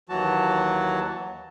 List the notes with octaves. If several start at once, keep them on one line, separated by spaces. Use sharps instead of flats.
D#2 E3 F#3 F#4 A5